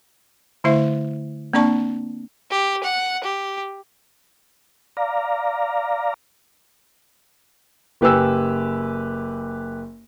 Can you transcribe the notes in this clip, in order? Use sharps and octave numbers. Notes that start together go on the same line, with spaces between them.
D3 A3 E4 C5 E5
A#3 C4 D4 D5 A5 C#6
G4
F#5
G4
D5 F5 A#5
F#1 G4 B4 G#5 E6